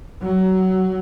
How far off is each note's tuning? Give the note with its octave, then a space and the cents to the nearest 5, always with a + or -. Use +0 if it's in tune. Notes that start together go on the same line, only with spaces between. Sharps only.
F#3 +20